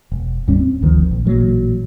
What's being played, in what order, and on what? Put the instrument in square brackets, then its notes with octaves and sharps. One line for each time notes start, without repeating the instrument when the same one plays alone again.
[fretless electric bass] E1
D#2 G#2 G3 C#4
C4
F#1 D2 D#3 F3
A#1
A1 A#2 F#3